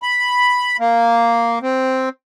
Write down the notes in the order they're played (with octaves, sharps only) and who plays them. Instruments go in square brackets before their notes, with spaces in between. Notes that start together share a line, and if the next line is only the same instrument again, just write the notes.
[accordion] B5
A#3
C4